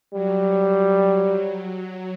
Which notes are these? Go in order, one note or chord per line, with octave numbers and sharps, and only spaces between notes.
F#3 G3